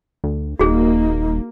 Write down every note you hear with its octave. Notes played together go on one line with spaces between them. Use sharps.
D2
D#1 A#3 D#4 F#4 G#4